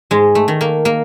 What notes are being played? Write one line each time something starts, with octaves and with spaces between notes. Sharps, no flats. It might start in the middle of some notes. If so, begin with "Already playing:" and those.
G#2 G#3
A3
D#3
A#3
A#3